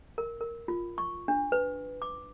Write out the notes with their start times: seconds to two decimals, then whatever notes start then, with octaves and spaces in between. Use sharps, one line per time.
0.18 A#4
0.41 A#4
0.68 F4
0.98 C#6
1.28 D4
1.52 B4
2.02 D6